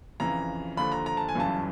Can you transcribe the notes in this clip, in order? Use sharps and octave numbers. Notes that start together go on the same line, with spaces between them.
F2 C#3 E3 A#5
D#2 D3 F3 B5
A#5
A#5
A5
G#5
G1 F#2 C#3 E3 A5